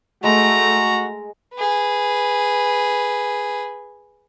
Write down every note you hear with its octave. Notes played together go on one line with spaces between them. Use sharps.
G#3 A3 F#4 A#5
G#4 B4